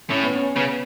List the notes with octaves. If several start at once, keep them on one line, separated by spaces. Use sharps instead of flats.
A2 C#4
B3
C#4
C#3 B3